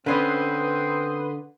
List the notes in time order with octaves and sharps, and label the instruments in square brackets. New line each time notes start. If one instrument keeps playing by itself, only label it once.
[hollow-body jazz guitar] D3 C#4 [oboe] C4 [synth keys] B4 C6 D#6